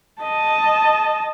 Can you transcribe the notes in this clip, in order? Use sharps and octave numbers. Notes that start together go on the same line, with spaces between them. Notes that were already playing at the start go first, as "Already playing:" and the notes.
D#5 A5